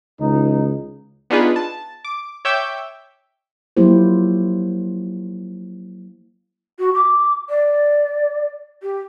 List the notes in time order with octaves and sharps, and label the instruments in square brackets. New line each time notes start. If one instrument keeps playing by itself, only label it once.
[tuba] C#2 [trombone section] E3 D#4
[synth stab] B3 D4 D#4 F4 G#4 B4
A5
D6
C#5 E5 G5 D6 E6 G6
[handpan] F3 F#3 A#3 E4 G4 C5
[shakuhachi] F#4
D6
D5
G4